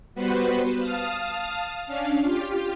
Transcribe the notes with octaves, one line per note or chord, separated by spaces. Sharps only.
G3 B3 F#4 B4 C5
F5 A5 D#6 F6
C#4 D4 F5
F4 G4